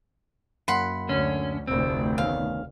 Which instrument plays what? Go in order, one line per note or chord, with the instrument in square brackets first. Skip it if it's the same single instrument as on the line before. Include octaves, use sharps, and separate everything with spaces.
[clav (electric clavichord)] F#2 A#3 [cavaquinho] F#5 B5 C6
[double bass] D2 [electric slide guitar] D3 C#4
[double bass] F1 D2 [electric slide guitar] C4
[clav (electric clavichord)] D#3 B3 C#4 [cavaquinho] F5